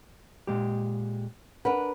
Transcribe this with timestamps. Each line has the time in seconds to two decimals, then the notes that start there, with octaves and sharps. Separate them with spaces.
0.47 A#2 G#3 G4
1.65 D4 A#4 B4 F#5